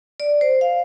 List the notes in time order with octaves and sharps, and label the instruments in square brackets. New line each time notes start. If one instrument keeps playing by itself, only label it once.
[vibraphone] D5
C5
F5